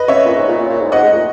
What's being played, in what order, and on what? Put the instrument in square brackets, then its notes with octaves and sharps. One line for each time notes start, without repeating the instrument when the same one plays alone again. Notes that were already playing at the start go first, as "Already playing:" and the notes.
Already playing: [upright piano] B4 D#5
C#5 E5
[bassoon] A#2
G#2
A#2
A#2
A#2
G#2
[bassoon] G#2 [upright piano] D#5 F#5
[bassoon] G#2
A#2